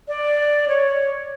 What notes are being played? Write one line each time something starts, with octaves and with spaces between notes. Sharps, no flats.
D5
C#5